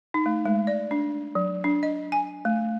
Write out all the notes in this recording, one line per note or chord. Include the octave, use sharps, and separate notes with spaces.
D#4
A3
G#3
D5
D4
F#3
D4
D#5
G#5
A3